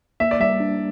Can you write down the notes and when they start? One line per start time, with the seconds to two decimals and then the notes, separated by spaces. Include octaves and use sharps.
0.20 A#3 E5
0.31 D5
0.40 G3 E5
0.60 D4